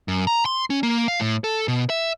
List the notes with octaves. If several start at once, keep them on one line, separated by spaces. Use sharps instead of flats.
F#2
A#5
C6
C#4
A#3
F5
A2
A4
B2
E5